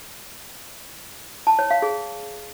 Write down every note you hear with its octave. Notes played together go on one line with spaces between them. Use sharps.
A5
C#5
F5
G#4